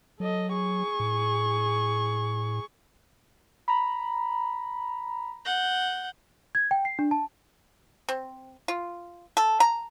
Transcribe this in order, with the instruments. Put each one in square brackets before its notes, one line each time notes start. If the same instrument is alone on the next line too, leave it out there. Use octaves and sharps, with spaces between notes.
[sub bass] F#3 [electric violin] A4 D#5
[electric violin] G#4 C#6
[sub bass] A2
[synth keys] A#5 B5
[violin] F#5 G6
[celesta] G#6
G5
C7
D4
A5
[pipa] C4
F4
A4
A#5